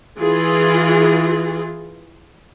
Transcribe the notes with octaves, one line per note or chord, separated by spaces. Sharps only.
E3 F4 G#4